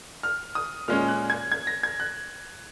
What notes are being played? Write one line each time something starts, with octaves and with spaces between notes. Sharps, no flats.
F6
D#6
A#2 G#3 C#4 F6
F#6
G#6
G#6
A#6
G#6
F#6